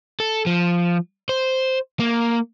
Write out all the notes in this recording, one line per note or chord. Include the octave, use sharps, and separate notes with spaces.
A4
F3
C5
A#3